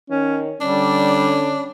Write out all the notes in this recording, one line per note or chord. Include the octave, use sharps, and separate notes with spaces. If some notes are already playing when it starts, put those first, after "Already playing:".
D#3 C#4
D3 G3 C#4 D4